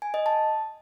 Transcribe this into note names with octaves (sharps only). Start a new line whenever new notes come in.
G#5
D#5
A5